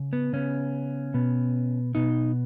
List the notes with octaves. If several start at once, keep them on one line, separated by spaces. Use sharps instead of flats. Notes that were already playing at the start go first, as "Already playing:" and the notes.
Already playing: C#3
B3
C#3 B3 C#4
B2 B3
B2 B3 D#4